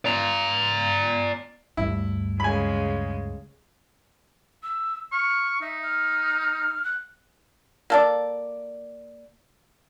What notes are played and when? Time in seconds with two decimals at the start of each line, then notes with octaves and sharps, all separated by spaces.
0.05 D5 A#5
1.77 D2 G2 E4
2.40 C#3 G#3 G#5 B5
4.63 E6
5.12 C#6 F6
5.61 D#4 E5
5.83 F6
6.84 F#6
7.90 A#3 A4 D5